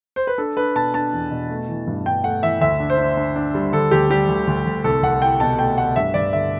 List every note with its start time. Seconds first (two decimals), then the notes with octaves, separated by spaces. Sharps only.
0.16 C5
0.27 B4
0.38 D4 A4
0.57 D4 B4
0.75 B2 A5
0.94 D4 A5
1.13 E2
1.31 B2
1.49 A3
1.69 E3
1.87 G2
2.06 G2 G5
2.24 A3 F#5
2.43 E3 E5
2.61 D2 E5
2.80 D4
2.90 C5
2.98 D4
3.17 D4
3.36 D4
3.55 G3
3.72 D3 A4
3.91 D2 G4
4.10 G3 G4
4.28 D2
4.47 D2
4.66 D2
4.84 C2 A4
5.03 C2 F#5
5.22 E4 G5
5.40 B2 A5
5.59 A3 G5
5.78 A3 F#5
5.96 G2 E5
6.14 G2 D5
6.33 D3 E5